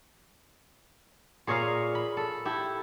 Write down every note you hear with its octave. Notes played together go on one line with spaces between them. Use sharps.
A#2 G#4 C#5 D#5 F5 A#5
B5
A4
E4 G4 A4